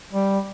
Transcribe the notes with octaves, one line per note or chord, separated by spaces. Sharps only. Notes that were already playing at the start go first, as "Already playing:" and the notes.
G3